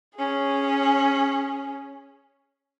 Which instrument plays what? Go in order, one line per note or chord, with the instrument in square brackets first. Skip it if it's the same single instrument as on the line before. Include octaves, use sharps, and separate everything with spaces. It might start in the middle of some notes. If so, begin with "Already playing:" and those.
[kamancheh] C#4 G#4